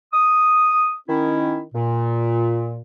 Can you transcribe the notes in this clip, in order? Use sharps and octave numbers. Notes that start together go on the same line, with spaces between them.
D#6
D#3 C#4 E4
A#2